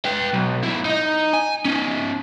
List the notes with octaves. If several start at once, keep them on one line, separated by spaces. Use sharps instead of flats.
B4 G5
B1
B1 E4
D#4 D#5
G#5
C#4 D#4